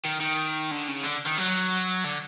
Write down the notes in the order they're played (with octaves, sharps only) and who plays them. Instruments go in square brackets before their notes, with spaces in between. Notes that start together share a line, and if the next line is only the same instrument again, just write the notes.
[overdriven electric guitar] D#3
D#3
D3
C#3
D3
D#3
F#3
D3